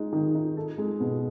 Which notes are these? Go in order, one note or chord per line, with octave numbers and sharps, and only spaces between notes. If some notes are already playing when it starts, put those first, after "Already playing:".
Already playing: G#3 D#4
D#3
D#4
A4
G#3
B2